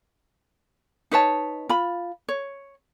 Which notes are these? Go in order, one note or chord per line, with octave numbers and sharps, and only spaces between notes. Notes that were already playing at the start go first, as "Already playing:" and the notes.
D#4 B4 C#5 A5
F4 B5
C#5